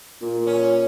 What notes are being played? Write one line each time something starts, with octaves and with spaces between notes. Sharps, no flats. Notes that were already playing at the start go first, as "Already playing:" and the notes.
A#2
C#4